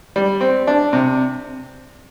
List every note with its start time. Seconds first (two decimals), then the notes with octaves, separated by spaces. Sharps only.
0.16 G3
0.41 C4
0.67 D4
0.93 C3